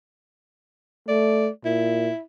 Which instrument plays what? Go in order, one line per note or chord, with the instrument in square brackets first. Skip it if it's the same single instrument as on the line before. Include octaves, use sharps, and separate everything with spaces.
[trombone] A3 [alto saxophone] D5
[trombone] A#2 [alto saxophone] E4